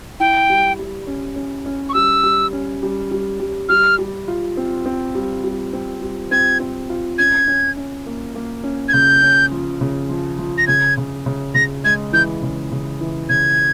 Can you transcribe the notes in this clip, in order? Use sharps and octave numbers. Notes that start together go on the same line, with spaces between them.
E4 G5
G3
G3
C#4
C#4
C#4
C#6
G3 E6
G3
C#4
G3
G3
G3
G3 F6
G3
F4
C4
C4
G3
G3
C4
G3
C4 G#6
C4
F4
C#4 G#6
C#4
C#4
A#3
A#3
C#4
G#6
C#3 G6
C#4
F3
C#3
F3
F3
A#6
C#3 G#6
C#3
C#3
C#3 A#6
G#3 G#6
E3 G6
C#3
C#3
E3
C#3 G#6